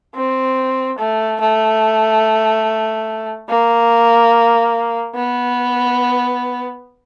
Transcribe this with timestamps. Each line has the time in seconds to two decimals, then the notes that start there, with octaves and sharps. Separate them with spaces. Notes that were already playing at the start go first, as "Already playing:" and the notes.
0.15 C4
0.98 A3
1.40 A3
3.48 A#3
5.14 B3